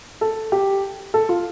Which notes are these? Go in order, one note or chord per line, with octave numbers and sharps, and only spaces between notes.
A4
G4
A4
F4